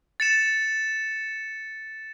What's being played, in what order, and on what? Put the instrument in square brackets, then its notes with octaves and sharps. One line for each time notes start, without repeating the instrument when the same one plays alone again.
[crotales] A6 C#7 E7